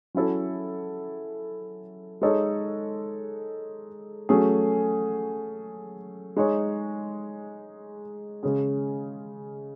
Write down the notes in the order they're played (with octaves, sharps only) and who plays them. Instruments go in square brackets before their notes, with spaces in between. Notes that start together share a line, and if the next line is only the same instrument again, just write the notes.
[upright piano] F#3 C#4 E4 A4
G#3 D#4 A4 C#5
F#3 A3 C#4 G#4
G#3 D#4 G#4 C#5
C#3 G#3 C#4 G#4